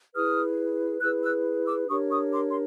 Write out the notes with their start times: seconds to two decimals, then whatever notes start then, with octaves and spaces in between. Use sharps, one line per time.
0.14 E4 G#4 B4 D#6 F6
1.01 E4 G#4 B4 E6 F#6
1.23 E6 F#6
1.66 D6 E6
1.88 D4 G4 A#4 C#5 C#6 D#6
2.10 C#6 D#6
2.32 C6 D6
2.50 C6